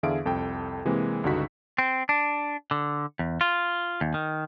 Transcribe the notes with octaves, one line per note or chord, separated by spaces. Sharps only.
E2 D3 G#4 E5 F5 D7
C2 F2 A4 G5
C3 E3 G#3 A#3 C4
C#2 G2 D3 D#4 F#4 B6
C4
D4
D3
E2
F4
D#2
D#3